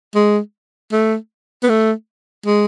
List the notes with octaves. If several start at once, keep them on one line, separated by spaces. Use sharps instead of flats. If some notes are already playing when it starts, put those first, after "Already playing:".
G#3
A3
B3
A3
G#3